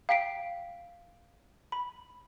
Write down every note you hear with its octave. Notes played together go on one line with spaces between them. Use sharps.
F5 G5 B6 C7 D7
B5